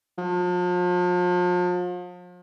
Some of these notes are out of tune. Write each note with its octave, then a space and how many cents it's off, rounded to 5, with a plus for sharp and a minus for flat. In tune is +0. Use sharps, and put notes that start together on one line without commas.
F3 +40